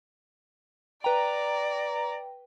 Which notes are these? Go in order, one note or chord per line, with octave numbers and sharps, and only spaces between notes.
B4 D5 G5 A#5